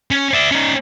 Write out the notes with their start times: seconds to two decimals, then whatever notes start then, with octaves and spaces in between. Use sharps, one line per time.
0.11 C#4
0.34 D5 E5
0.51 C#4 D#4